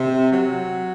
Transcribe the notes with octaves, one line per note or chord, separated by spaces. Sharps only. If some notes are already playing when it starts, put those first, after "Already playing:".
Already playing: C3
F#3